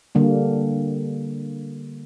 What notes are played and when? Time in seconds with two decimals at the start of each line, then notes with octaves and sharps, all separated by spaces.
0.15 D3 G3 A#3